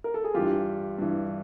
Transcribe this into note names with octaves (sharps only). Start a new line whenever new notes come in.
A#4
A4
G#4
G2 E3 F4 G4
G2 E3